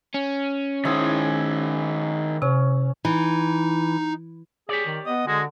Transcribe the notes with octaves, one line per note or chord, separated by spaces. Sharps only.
C#4
D#3 E4 G#4 C5
C3 C#4
E3 D#4
G4 G#4 C#5 D5
D#3
B3 D#5
D3 G#3 F#4